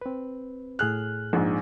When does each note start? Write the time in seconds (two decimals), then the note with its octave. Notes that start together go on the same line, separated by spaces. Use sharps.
0.01 C4 B4
0.79 A2 G#4 F6 F#6
1.33 A#1 G#2